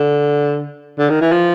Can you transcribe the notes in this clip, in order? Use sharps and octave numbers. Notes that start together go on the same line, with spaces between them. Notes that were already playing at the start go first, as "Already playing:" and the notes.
Already playing: D3
D3
D#3
E3
F3